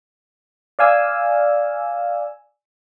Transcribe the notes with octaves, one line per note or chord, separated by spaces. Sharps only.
D5 F5 G#5 E6